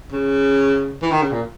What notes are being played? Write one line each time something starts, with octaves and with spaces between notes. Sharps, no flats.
C#3
E3
D#3
C#3
A#2